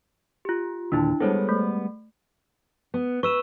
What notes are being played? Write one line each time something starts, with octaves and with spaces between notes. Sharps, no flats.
F4 G4
D#2 A#2 D3 D4 E4 A5
G3 G#3 B3 A4 C5 C#5
A3
B3
B4 C#6 E6 E7